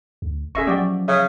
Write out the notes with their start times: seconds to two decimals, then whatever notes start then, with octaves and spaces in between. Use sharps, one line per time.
0.22 D2
0.55 D#1 A#2 C#4 G#4 E5 C#6 A#6
0.67 F3 F#3 G4 D5 F#5 C#6
1.08 C#3 E5 D#6